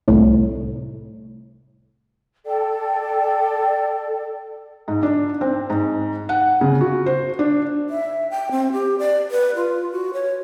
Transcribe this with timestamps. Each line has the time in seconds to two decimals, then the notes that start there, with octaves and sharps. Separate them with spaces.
0.08 C2 A2
2.46 A4 D5 G5
4.88 G#2
5.03 D4
5.41 C4
5.70 G#2
6.29 F#5
6.61 C#3
6.81 F#4
7.06 C5
7.39 D4
7.90 E5
8.30 G5
8.51 C4
8.73 G4
8.99 D5
9.31 B4
9.56 F4
9.92 F#4
10.13 C#5